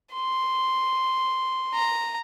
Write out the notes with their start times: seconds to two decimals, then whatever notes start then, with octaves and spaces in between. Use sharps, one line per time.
0.13 C6
1.74 A#5